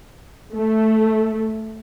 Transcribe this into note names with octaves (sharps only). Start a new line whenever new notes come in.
A3